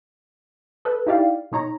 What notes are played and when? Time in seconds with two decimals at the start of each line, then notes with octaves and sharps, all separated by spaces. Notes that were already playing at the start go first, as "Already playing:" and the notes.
0.85 A4 B4
1.06 D#4 E4 G4 D5 F5
1.52 B2 D#4 C#5 A#5